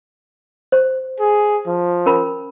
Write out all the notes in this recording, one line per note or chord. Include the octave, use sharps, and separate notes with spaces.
C5
G#4
F3
C#4 A#4 B5